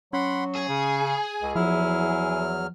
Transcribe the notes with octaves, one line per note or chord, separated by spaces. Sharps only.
F#3 C#4 F#5 B5 C6
G#4 G#5
C#3
C#2
E2 F3 F#3 E4 F6